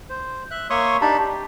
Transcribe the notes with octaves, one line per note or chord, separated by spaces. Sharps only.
C5
E5 F#6
A#3 C#5 E5 C6 C#6 D#6
D4 D#4 G4 A5 B5
G4